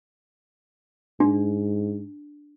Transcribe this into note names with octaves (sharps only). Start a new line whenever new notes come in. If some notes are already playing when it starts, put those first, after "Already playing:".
G#2 D4